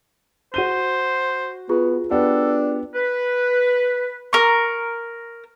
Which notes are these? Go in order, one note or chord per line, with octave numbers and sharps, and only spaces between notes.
F#4 C5 D#7 G7
B3 F4 G#4
B3 D4 G4 A4
B4
A#4 C#6